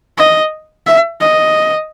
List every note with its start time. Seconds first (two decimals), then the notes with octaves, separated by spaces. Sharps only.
0.18 D#5
0.87 E5
1.21 D#5